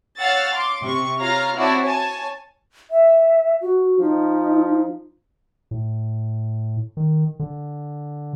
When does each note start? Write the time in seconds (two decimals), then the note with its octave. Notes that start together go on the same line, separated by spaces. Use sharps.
0.18 C#5 F5 F#5 E6 A6
0.54 C6 D6
0.84 C3 C#6
1.19 F4 C#5 F5 A#5 F6
1.55 C4 E4 F#4 C#5 D5 A5
1.84 C#5 G#5 A5
2.91 E5
3.62 F#4
4.00 F3 D#4
5.71 A2
6.97 D#3
7.39 D3